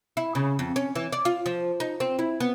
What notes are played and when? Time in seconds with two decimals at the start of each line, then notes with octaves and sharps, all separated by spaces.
0.17 E4
0.35 C#3
0.59 F2
0.76 C#4
0.95 E3
1.13 D5
1.25 F4
1.46 F3
1.80 D#4
2.00 C4
2.19 E4
2.40 B3